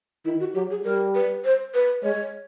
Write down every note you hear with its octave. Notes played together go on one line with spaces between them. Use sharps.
D#3 E4
F#4
F#3 G4
G#4
G3 A#4
B4
C5
B4
G#3 C#5